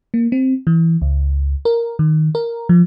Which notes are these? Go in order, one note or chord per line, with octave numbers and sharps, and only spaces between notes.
A#3
C4
E3
C#2
A#4
D#3
A#4
F3